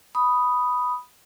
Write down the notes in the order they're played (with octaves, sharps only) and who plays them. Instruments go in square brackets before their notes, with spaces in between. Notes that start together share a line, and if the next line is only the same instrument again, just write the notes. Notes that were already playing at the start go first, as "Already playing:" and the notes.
[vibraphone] B5 D#6